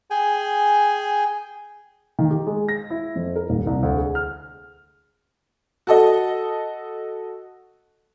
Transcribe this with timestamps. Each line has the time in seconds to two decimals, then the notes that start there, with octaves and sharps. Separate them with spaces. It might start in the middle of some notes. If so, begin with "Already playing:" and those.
0.10 G#4 G5 G#5
2.19 D#3
2.31 G4
2.47 G#3
2.69 A#6
2.90 E4
3.15 F2
3.36 A#4
3.50 D#1
3.67 C2
3.83 D2
3.97 G#4
4.15 F6
5.87 F#4 A4 D#5